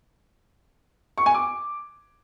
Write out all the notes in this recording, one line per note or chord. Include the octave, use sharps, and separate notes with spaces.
C#6
G#5
D6